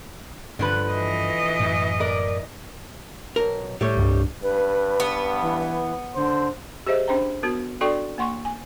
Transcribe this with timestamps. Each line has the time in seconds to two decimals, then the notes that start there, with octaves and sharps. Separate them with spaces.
0.59 G2 D3 F3 B4
0.91 E3 D#5
1.60 F#2 A2
2.00 A#4 D5
3.36 B1 A#4
3.81 A2 G3 A3 C#5
3.97 C2 G2
4.43 G2 B4
5.00 B3
5.42 E3
6.15 D3 C5
6.86 G4 G#4 C5 D#5 E5
7.08 C#4 D4 C5 G5 A#5
7.43 B3 F#4 A#4
7.81 D4 F#4 A4 D5 G5 C#6
8.18 A#3 F#5 C6 C#6
8.45 G#5